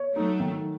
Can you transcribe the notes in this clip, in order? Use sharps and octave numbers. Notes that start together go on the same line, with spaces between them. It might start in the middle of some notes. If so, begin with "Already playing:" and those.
Already playing: C#5
F#3 A3 D#4
D#3